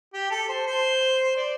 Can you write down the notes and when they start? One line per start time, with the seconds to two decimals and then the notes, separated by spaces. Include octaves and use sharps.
0.13 G4
0.31 A4
0.49 C5
0.66 C5
1.37 D5